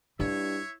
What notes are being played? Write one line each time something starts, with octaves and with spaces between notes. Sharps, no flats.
G2 E4 C#5 E5